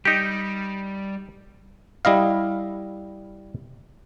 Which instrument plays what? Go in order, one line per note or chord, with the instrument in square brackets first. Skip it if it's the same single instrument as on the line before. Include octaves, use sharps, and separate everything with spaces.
[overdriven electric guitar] G3 [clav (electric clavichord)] D#4 G4
[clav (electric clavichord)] G3 E4 D#5 F5